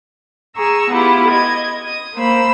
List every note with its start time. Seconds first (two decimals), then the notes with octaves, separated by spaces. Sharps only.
0.56 G#4 A#5 C#6 E6
0.91 B3 E4 F4 G4
1.28 D#5 G#6
1.86 D#6
2.15 A#3 C5 B5 E6